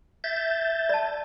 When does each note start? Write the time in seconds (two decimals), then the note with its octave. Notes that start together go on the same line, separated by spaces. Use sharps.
0.24 E5 G6 A6
0.89 D5 A5